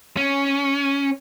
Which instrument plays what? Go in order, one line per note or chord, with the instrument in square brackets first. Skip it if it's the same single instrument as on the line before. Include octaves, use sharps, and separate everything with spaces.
[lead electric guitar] C#4